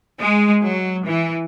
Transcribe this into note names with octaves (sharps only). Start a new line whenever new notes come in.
G#3
F#3
E3